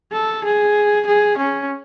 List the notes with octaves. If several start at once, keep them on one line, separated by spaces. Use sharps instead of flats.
A4
G#4
G#4
C#4